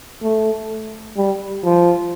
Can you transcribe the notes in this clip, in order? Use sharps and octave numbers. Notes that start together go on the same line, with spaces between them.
A3
G3
F3